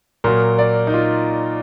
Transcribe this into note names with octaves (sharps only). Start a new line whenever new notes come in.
A#2 F#3 A#3 A#4
D5
D#4
F4